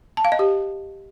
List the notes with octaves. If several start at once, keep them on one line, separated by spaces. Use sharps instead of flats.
A5
F5
D#5
G4